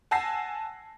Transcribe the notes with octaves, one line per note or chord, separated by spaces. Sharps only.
F#5 G#5 A5 E6 A#6 C7